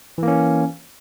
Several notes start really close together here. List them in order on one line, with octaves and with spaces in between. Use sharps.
E3 A#3 C#4